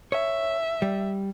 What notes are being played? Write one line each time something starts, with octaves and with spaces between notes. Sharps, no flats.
C#5 E5
G3